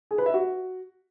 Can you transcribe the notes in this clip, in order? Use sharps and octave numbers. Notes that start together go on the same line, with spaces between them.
G#4
B4
E5
F#4